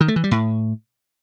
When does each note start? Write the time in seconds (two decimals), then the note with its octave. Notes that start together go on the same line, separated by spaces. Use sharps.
0.01 D#3
0.08 A3
0.16 E3
0.24 G3
0.31 A2